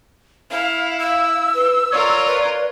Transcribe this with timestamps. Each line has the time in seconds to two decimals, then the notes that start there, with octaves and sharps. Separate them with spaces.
0.51 E4 F5
1.00 F5 E6
1.55 B4
1.92 F4 A#4 C#5 D5
2.27 B4